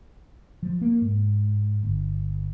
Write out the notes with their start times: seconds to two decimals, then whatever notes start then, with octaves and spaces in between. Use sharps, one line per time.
0.63 F3
0.81 A#3
1.01 G#2
1.83 G1